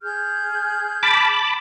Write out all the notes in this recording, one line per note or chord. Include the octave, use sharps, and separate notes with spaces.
G#4 F6 G6
A5 B5 D6